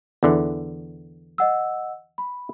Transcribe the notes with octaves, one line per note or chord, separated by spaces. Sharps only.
E2 D3 E3
D#5 F#5 E6
B5